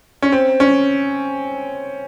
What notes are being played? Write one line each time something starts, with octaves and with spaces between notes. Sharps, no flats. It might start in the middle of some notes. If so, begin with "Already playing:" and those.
C#4
C4
C#4